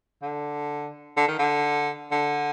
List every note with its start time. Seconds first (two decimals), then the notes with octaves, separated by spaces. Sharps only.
0.22 D3
1.17 D3
1.28 D#3
1.39 D3
2.12 D3